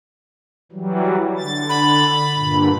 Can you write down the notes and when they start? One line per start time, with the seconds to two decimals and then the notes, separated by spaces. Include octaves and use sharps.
0.72 E3 F#3 G3
1.37 D3 A6
1.69 B5
2.35 G2 A#2 D3